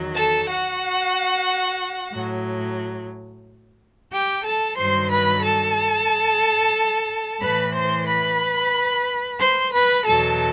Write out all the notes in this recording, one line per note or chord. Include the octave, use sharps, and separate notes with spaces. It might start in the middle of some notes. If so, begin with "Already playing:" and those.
Already playing: E2 D#3 F#3
A4 A5
F#4 F#5
A2 F#3
G4 G5
A4 A5
G2 D#3 F#3 C5 C6
B4 B5
A4 A5
A2 E3 B4 B5
C5 C6
B4 B5
C5 C6
B4 B5
E2 B2 F#3 A4 A5